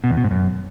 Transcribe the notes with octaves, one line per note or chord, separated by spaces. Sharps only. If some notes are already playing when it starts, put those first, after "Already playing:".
B2
E2
B2
G#2
F#2